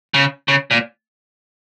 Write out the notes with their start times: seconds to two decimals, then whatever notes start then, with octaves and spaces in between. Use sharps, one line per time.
0.14 C#3
0.48 C#3
0.71 A#2